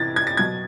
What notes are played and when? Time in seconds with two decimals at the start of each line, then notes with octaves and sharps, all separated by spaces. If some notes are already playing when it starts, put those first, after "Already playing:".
Already playing: C3 E3 G#6 A6
0.16 G#6
0.27 A6
0.37 B2 F#3 G#6